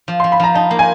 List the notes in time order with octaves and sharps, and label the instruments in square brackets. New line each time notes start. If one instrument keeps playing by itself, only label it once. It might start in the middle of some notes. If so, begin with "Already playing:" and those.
[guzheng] F3
[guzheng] F3 [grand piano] C6
[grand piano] B5
[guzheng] F3 [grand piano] A#5
[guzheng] D#4 [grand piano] A5
[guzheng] A#3
[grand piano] G#5